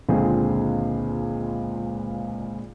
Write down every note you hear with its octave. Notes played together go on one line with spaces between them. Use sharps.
C#2 A#2 D3 C4 G#4